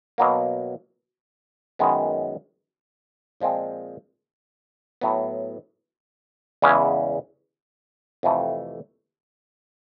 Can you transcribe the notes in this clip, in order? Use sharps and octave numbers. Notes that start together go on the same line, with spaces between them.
B2 F#3 A#3
F#2 D#3 G#3 B3
A#2 F3 G#3 C4
A2 F#3 B3
E2 C#3 E3 G#3 C#4
F2 C3 E3 A3